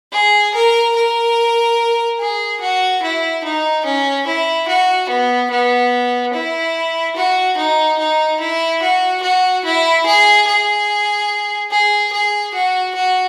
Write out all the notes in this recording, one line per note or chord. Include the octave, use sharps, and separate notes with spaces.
G#4
A#4
A#4
G#4
F#4
E4
D#4
C#4
E4
F#4
B3
B3
E4
F#4
D#4
D#4
E4
F#4
F#4
E4
G#4
G#4
G#4
G#4
F#4
F#4